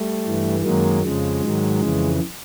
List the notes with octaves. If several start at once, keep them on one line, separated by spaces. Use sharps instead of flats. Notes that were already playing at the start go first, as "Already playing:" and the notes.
Already playing: G3 A3
G2 E3
F#2 D#3 F#3 G#3 A#3
F2 C#3 F3 G#3
G#2 D#3 F#3
F2 C#3 E3